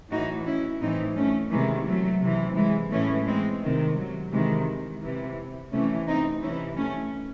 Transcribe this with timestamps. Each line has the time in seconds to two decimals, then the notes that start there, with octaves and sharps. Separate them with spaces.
0.11 A2 E3 D#4 F#4
0.46 C#4 E4
0.81 A2 E3 C4 D#4
1.16 A3 C#4
1.51 C3 D#3 E3 G#3
1.87 F#3 A3
2.21 C3 E3
2.56 E3 G#3
2.91 A2 E3 A3 C#4
3.26 G#3 C4
3.61 C3 D#3
3.97 F#3
4.32 C3 D#3 E3 G#3
5.01 C3 E3
5.72 C3 E3 A3 C#4
6.07 C4 D#4
6.42 C3 E3 C#4 E4
6.77 A3 C#4